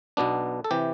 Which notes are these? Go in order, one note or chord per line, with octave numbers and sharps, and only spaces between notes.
B1 B2 B3 D4
A4
C3 E3 G4